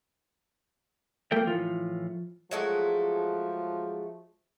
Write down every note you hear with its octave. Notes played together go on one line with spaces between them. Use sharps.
F3 A3 A#3 G5
A2 E3 F3 F4
F3 F#3 G#3 A3